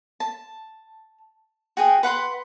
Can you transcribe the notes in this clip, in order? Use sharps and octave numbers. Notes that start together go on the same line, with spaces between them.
A5
F#4 G#4 G5
B4 F#5 B5 C6